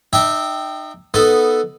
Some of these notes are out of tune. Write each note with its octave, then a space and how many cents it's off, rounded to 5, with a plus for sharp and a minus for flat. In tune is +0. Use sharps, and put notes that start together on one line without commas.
D#4 -35 E5 -5 G5 -5
B3 +0 D#4 +0 A4 +0